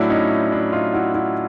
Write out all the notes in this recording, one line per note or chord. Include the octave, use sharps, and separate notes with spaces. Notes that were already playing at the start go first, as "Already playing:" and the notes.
Already playing: A2 F#3 D4 E4
C#4 D#4
D4
D#4 F4
E4 F#4
E4 F#4